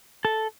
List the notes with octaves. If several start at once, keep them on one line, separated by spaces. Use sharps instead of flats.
A4